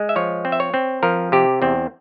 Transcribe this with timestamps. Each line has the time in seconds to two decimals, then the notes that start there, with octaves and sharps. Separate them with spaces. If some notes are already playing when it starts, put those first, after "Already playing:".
Already playing: G#3
0.09 E5
0.16 F3 C#5
0.45 C4
0.52 E5
0.60 C#5
0.74 C4
1.03 F3 A#4
1.32 C3 G4
1.62 E2 C4